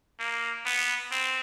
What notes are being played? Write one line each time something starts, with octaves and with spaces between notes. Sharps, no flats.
A#3
B3
C4